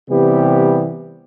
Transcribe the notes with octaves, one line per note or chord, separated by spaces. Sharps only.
C3 E3 G3 B3 G4